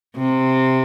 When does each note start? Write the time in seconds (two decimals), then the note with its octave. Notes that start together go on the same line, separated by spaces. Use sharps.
0.17 C3